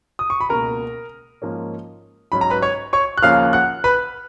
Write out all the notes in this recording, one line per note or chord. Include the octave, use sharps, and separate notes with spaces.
D#6
C#6
B5
C#2 B2 A#3 A#4 A#5
G#2 F3 A#3 C#4
G#2 F#3 C#4 B5
A#5
B4 B5
C#5 C#6
C#5 C#6
F#6
D#2 C#3 F3 A#3 C#4 F5 F6
F#5 F#6
B4 B5